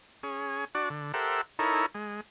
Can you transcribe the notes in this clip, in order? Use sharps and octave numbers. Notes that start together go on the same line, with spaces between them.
C#4 G#4
D4 F#4 D5
D3
G4 A4 A#4 C5 E5 F#5
D#4 E4 A4 A#4 C#5
G#3